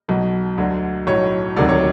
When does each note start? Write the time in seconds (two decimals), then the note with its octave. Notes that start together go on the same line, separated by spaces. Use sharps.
0.08 B1 B2 F#3
0.58 D2 D3 F#3
1.07 B1 A2 F#3 C#5
1.56 E1 D2 C3 D#3 F#3 D5
1.69 C#5